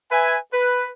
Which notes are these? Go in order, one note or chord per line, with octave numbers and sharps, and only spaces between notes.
B4 E5 G#5
B4